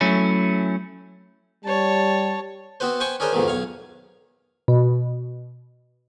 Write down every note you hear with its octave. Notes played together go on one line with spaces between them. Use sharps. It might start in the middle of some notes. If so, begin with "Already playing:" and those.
F#3 A3 C#4 E4
G3 C#5 A5
B3 C4 F#4 B4 C5
B4 C5 G5 G#5 C#6
C#4 D4 G#4 A#4 C5
F2 G#2 B2 D#3 E3
B1 C#5 F5
B2